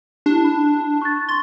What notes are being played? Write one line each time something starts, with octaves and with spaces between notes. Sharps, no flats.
D4 E4 G4
B5
C#6 F#6 A6
C6 C#6 A6